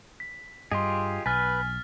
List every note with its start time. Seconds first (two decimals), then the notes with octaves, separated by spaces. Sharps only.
0.20 B6
0.72 G2 F4 G4 G#4 D#5 C6
1.26 B1 B4 G#5 F6 A6 B6